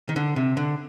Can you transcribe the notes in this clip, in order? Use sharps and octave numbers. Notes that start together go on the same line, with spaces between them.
D#3
D3
C3
D3